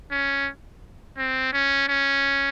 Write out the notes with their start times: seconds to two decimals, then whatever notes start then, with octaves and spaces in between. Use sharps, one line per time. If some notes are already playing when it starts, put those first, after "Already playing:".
0.12 C#4
1.18 C4
1.53 C#4
1.88 C#4